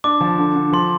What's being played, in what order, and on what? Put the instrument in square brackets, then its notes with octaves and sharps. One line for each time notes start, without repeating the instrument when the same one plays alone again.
[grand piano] D4 [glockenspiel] D6
[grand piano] F3
D3
D3
[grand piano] F3 [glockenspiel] C6